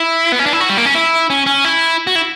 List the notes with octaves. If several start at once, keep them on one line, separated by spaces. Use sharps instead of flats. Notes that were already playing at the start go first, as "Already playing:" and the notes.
Already playing: E4
B3
C#4
D4
E4
F#4
G3
A#3
C#4
E4
C#4
C#4
E4
F#4
E4